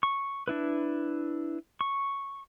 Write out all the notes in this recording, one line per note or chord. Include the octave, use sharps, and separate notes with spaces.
C#6
D4 E4 B4
C#6